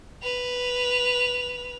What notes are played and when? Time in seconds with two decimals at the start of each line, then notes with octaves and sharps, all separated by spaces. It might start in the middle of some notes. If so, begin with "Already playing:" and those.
0.23 B4 F7